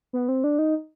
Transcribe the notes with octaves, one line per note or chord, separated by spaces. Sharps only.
B3
C4
D4
D#4